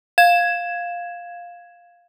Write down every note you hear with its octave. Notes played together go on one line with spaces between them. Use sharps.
F5 G#6 E7